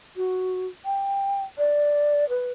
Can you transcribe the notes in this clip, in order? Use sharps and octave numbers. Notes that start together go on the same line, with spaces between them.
F#4
G5
D5
B4